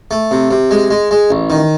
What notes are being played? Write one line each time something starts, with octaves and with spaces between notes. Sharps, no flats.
A3
C3
C3
G#3
G#3
G#3
A1
D#3